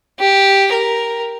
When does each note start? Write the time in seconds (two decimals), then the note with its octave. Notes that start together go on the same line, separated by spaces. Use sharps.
0.20 G4
0.73 A#4